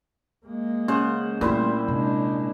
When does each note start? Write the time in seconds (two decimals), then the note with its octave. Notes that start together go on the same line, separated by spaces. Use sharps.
0.46 G#3 A#3
0.88 C#3 C5 F#5
1.41 A#2 G3 A3 C4 E4 C5
1.88 C3 G#3 D4